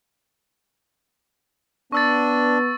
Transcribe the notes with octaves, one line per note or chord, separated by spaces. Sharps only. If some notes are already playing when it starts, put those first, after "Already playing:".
B3 D4 C#6 E6 A6